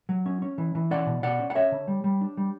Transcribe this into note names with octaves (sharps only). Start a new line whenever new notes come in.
F#3
C#4
C#4
E3
E3
C#4 D5 F#5
B2
B2 D5 F#5
C#4
F#5
C#4 C#5 E5
D3
G3
G3
D4
G3